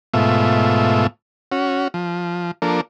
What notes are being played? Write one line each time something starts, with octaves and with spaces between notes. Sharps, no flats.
G#2 B2 A3 F4 E5
C#4 F#4
F3
F3 A#3 D4 A4 A#4